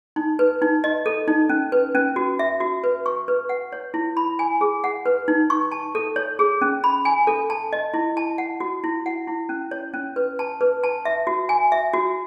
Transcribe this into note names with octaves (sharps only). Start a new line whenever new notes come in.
D#4
B4
D#4
D#5
A4
D#4
C#4
B4
C#4
F#4
E5
F#4
B4
C#6
B4
F#5
C#5
E4
B5
G#5
G#4
F#5
B4
D#4
C#6
A5
A4
C#5
G#4
C#4
B5
G#5
A4
A5
D#5
E4
A5
F#5
F#4
E4
F#5
E4
C#4
C#5
C#4
B4
A5
B4
A5
E5
F#4
G#5
E5
F#4